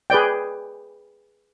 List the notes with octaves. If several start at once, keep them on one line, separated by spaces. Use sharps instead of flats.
G#4 B4 D5 G5